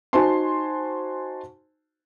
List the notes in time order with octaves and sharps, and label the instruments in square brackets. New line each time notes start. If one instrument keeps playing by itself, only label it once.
[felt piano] D#4 F#4 C5 G#5 A5 C6